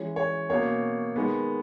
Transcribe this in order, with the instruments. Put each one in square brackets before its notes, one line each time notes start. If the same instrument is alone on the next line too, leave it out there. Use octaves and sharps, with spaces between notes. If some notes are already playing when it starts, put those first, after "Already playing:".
Already playing: [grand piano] E3 G#3 C#4
C#5
B2 A#3 C#4 C#5
D#3 G#3 B3